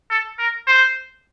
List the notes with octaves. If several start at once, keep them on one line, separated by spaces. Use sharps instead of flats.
A4
A#4
C5